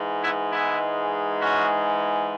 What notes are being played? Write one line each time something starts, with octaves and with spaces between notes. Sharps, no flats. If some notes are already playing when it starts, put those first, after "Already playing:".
Already playing: G#2 E3 G#3
B3 E4
B3 E4
C#4 F#4